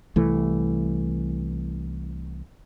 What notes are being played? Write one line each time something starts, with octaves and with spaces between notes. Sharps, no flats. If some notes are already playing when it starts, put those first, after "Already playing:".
C2 E3 A3